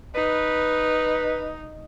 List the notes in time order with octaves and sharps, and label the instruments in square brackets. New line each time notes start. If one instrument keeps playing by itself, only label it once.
[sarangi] D#4 [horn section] B4